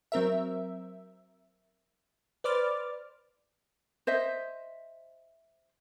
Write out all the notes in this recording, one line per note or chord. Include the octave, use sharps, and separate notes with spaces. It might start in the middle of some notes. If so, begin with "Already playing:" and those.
F#3 C4 A#4 E5
B4 C5 D5 D6 F6 A6
C5 D#5 E5